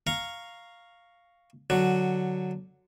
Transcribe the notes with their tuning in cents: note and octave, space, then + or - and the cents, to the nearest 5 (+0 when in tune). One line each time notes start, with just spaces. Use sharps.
F5 +0 A#5 -5 C#6 +0
D3 +0 F#3 +0 F#4 +0